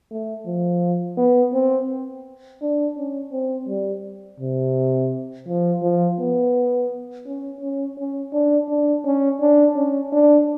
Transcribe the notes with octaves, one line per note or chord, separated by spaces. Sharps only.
A3
F3
B3
C4
D4
C#4
C4
G3
C3
F3
F3
B3
C#4
C#4
C#4
D4
D4
C#4
D4
C#4
D4